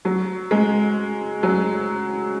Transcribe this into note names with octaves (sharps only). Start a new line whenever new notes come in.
F#3
G#3
F#3